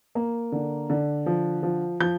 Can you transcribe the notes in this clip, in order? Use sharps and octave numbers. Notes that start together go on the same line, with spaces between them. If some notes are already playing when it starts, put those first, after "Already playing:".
A#3
D3
D3
F3
F3
F3 G6